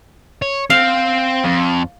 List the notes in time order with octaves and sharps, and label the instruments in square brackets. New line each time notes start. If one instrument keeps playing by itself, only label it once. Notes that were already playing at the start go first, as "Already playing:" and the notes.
[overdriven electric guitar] C#5
[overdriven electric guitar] C4 [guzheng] F5
[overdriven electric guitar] F2